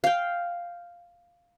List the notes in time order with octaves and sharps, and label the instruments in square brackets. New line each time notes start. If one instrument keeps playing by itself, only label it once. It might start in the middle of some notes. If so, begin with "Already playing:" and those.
[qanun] F5 G5